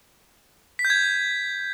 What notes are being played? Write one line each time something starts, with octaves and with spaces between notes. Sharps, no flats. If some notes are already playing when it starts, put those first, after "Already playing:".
B6
G6
G#6
G6